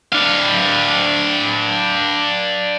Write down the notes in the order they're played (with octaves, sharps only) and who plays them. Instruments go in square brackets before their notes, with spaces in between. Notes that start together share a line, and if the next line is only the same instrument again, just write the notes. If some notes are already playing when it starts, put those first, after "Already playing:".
[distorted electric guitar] D4 F5